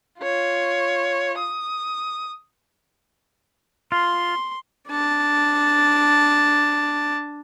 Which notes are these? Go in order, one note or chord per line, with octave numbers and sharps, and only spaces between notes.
F4 C#5
D#6
F4 C6
D4 A5